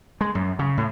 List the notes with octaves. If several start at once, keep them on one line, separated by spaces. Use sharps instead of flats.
G#3
F#2
C#3
A2